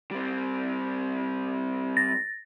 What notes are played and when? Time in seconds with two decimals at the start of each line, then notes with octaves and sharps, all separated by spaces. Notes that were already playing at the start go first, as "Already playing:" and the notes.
0.11 G3 C4
1.97 A6 A#6